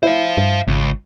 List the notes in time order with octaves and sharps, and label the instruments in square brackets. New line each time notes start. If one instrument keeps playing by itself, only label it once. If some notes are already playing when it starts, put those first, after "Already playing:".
[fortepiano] E4 [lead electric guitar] C5 F5
[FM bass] G2
[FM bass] G#1 [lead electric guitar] C#2